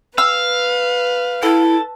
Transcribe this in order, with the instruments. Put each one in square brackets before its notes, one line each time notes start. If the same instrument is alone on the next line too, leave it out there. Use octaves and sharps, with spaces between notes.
[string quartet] B4 [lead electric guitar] F5 [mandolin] E6
[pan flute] E4 [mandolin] A4